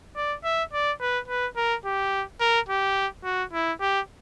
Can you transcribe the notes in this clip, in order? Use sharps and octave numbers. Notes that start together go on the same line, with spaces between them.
D5
E5
D5
B4
B4
A#4
G4
A#4
G4
F#4
E4
G4